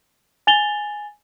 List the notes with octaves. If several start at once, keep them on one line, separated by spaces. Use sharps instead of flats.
G#5 A6 F7 G7